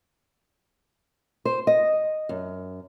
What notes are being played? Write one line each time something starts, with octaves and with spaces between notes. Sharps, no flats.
C5
D#5
F#2